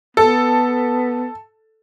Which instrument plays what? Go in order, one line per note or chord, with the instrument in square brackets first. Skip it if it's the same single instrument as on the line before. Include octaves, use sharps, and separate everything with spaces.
[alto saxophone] B3 [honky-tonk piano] A4